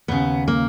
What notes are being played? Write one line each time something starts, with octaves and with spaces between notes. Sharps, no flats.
D#2 C#3 B3
A#3